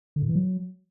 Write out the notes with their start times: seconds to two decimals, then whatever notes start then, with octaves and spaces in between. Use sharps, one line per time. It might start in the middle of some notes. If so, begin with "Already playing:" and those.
0.16 D3
0.22 A2
0.29 E3
0.35 F#3